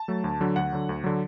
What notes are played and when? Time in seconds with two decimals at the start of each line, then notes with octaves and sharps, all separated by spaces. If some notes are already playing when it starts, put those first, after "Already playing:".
Already playing: A5
0.08 F#3 A3
0.24 D2
0.41 D3 F#3
0.56 D2 F#5
0.72 D3 F#3
0.89 D2
1.04 D3 F#3